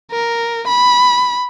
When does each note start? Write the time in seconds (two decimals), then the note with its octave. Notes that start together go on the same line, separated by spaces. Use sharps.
0.11 A#4
0.68 B5